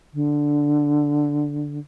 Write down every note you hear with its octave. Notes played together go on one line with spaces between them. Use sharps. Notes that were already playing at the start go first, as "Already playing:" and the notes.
D3